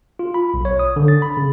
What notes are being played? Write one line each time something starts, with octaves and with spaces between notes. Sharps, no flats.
F4
B5
B1
C#5
D#6
D3
A6
B5
C#3